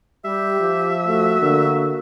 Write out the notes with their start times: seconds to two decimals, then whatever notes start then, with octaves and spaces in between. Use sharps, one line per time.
0.24 G3 G4 E5
0.60 F3
1.07 A3 F#4
1.41 D3 A#3